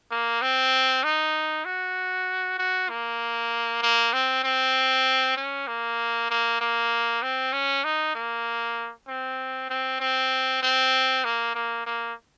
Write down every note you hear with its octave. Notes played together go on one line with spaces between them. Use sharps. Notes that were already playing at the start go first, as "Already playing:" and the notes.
A#3
C4
D#4
F#4
F#4
A#3
A#3
C4
C4
C#4
A#3
A#3
A#3
C4
C#4
D#4
A#3
C4
C4
C4
C4
A#3
A#3
A#3